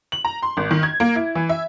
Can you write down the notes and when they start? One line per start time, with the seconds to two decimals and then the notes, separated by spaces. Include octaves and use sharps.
0.12 F#7
0.25 A#5
0.43 C6
0.57 G#1
0.71 D#3
0.83 G#6
1.00 A#3
1.15 E4
1.35 E3
1.49 E5